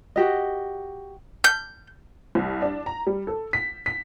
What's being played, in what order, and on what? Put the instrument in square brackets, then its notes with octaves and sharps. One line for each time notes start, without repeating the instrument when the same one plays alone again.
[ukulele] F#4 G4 D#5
[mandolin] G6
[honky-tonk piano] C2
D4
A#5
G3
A4
B6
B6